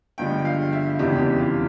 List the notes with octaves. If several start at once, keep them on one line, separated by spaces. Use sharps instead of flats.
G1 G2 F3 G#3 G5
F5
E5
F1 E2 C#3 E3 G#3 G4
G4
F4